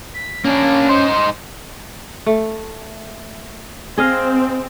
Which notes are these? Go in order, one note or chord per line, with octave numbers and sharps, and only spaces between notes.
B6
A#3 C#4 D4
D#4 C5
A3
C4 G#4 D#5 F5